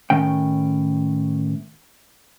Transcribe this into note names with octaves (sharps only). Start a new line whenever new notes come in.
A2 D#3 C#4 G5